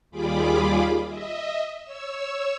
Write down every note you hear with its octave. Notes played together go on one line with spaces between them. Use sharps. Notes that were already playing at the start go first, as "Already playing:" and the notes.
D#2 G3 F4 G#4 B5 D6
D#5 E5
C#5 E6